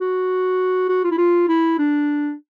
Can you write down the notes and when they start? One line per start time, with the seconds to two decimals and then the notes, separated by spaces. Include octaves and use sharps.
0.01 F#4
0.89 F#4
1.04 F4
1.11 E4
1.18 F4
1.48 E4
1.78 D4